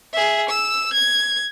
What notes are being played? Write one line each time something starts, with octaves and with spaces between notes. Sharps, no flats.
G#4 E5
E6
G#6